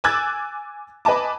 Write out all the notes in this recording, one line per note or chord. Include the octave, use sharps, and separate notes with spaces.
G#5 D6 E6 F#6 G#6 A6
B4 D#5 G#5 A5 D6